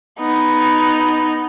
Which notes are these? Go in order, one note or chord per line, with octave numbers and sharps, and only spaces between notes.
B3 D#4